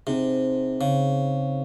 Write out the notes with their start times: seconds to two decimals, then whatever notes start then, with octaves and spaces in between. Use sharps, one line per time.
0.07 C3 C4 D#4 G#4 C5
0.81 C#3